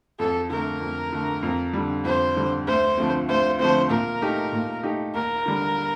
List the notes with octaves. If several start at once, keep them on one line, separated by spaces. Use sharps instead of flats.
F2 A4
D3 A3 A#4
F2
D3 A3
F2
D3 G3
F2 C5
D3 G3
D2 C5
D3 F3 A3 C4
D2 C5
D3 F3 A3 C4 C5
A#2 A#4
A3 D#4 G4
A#2
A3 D#4 G4
D#2 A#4
D3 G3